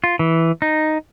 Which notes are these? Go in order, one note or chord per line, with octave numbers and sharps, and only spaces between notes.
F4
E3
D#4